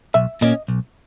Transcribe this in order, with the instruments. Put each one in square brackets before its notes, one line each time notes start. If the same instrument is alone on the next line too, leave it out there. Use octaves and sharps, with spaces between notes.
[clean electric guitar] B1 [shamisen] E5
[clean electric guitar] A#2 A#3 C#4 [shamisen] D#5
[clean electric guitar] B1